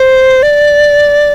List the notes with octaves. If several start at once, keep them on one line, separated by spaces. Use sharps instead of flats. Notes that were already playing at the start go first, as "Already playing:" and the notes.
Already playing: C5
D5